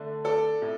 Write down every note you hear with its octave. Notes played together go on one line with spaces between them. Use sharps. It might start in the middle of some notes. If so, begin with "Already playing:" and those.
Already playing: D3 A3 D4
A4 D5
A2